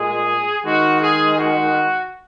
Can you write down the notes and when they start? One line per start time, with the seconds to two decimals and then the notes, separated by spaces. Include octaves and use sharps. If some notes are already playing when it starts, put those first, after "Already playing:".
Already playing: A#2 G#3 G#4
0.64 D#3 G#3 F#4
1.01 G#4
1.37 F#4